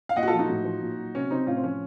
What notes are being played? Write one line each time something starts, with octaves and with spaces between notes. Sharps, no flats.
F5
A#2 D#5 F#5
F#4
F4 A4
F3
D#4 F#4
A2
F3
A#2
F#3
C3 C#4
C3 C4 D#4
A2 C#4 F4
C4
F3 C#4